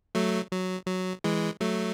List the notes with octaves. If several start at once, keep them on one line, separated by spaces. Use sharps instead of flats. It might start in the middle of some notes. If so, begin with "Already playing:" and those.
F#3 A3
F#3
F#3
E3 G#3
F#3 A3